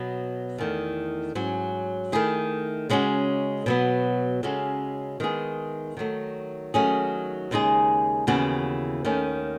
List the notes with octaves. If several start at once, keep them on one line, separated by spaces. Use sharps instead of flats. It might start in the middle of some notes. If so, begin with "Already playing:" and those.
Already playing: B2 F#3 B3
E2 D#3 A3
G#2 F#3 C#4
D#3 A3 E4 G#4
C#3 G#3 C#4 F#4
B2 F#3 B3
C#3 G#3 C#4 F#4 A4
D#3 G#3 B3 E4 G#4
D#3 F#3 A3
D#3 F#3 A3 C#4 G#4
D#2 C#3 G#3 D#4 G#4
D#2 C#3 E3 B3 F#4
D#2 D#3 A3 C#4